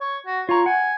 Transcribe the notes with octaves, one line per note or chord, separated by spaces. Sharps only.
C#5
F#4
F4 C#5 A#5
F#5 G#5